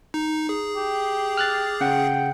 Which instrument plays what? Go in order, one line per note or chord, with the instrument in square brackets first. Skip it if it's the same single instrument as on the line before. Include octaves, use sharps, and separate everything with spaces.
[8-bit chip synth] D#4
G#4
[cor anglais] G4
[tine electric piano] F6 F#6 A6
[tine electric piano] C#3 F#5 [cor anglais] G5